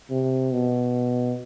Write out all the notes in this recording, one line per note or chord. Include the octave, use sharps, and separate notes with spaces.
C3
B2